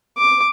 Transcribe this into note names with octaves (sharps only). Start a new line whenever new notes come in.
D6